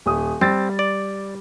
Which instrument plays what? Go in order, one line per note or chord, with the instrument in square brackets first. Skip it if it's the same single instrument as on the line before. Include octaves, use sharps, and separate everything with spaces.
[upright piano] D#1 D#6
[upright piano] G3 A6 [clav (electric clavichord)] C4
[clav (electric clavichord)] D5